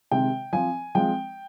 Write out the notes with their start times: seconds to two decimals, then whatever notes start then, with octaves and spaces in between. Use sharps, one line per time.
0.11 C3 D#3 G#3 C4 G5
0.53 F3 C4 G#5
0.95 F3 G#3 C4 G5